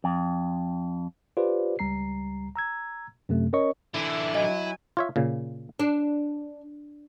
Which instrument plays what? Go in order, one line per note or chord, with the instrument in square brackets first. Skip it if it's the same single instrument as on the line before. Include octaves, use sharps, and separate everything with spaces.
[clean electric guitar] F2
[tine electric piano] F4 G4 B4 C5 D5
C#2 G3 A#5 C7
A#5 E6 G#6
F#2 C3 A3
C#4 A#4 C#5 D#5 C#6
[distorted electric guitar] D3 E3 [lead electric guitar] E4
[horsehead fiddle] F#3 G#5 [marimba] D#5
[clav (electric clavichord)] F4 C#5 E5
A#2 C#3
[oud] D4